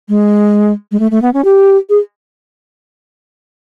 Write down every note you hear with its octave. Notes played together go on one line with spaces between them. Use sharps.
G#3
G#3
A3
A3
B3
C#4
G4
G#4